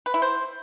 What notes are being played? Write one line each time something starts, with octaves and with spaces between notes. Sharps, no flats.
B4
E4
C5